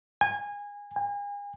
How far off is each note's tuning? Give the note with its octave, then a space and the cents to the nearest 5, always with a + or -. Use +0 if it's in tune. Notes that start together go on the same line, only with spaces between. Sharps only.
G#5 -25
G#5 -40